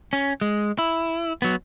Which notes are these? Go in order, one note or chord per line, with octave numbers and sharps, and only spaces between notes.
C#4
G#3
E4
F#3 B3